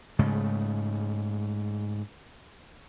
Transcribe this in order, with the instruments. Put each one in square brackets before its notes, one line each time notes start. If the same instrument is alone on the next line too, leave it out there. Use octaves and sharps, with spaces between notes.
[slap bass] G#2 C#3 G#3 A3